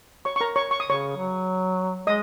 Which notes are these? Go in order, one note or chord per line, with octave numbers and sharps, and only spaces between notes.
C#5 C#6
C#6
A#4 A#5
C#5 C#6
C#6
D#6
C#3 C#5 C#6
F#3
G#3 D#5 D#6